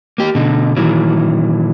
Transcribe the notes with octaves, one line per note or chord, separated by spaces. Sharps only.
A#3 G4
B2 D3 D#4
A#2 D#3 E3 F#3